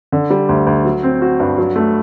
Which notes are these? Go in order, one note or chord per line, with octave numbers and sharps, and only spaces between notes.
D3
G3
D2
D2
F#3
C4
F#4
G2
F#3
A3